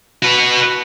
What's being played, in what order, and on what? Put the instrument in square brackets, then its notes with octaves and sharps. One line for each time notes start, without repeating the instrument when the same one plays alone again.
[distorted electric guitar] F#4 B4